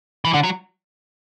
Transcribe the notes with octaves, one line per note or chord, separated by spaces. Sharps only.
E3
D3
F#3